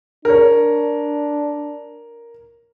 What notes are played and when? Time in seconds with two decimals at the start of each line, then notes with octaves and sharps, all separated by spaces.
0.25 D4 A#4 C#5